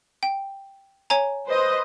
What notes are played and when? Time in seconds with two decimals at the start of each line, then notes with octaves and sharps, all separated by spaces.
0.23 G5
1.10 C#5 G#5 A#5
1.47 B4 C5 D#5